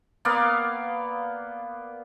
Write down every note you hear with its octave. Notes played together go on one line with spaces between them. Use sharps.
A#3 B3 D5 F5